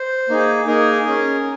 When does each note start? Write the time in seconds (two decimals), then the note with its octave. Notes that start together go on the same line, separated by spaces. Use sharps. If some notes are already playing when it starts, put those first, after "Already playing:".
Already playing: C5
0.29 A#3 D#4 G#4
0.67 A#3 D#4 G#4 A#4
1.06 C#4 G#4